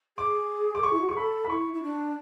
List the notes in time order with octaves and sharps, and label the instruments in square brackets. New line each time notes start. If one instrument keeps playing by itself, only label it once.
[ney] G#4 [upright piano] D6
[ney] A4 [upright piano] D6
[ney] G#4 [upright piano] C#6
[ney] E4
F#4
[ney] G#4 [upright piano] C#6
[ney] A4 [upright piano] B5
[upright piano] B5
[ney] E4 [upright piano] C#6
[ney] E4
D4